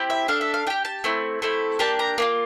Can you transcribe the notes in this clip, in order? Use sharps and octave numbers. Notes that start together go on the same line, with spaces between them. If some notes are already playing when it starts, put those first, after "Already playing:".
Already playing: C4 E4 G4
E5
D4 A4 F5
E5
F5
D4 G4 G5
A5
A3 C4 E4
A3 C4 E4 A4
A#3 D4 G4 A5
A#5
A#3 D4 F4